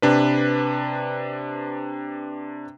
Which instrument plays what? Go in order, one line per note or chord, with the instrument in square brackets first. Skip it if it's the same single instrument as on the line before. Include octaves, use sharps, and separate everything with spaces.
[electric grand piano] C3 D4 B4